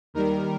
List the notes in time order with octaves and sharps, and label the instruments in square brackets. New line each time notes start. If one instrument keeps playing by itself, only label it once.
[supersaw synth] D#2 D#3 G3 A#4